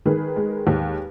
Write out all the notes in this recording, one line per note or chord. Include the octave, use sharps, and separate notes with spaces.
D#3 G#4 B4
G#3
D#2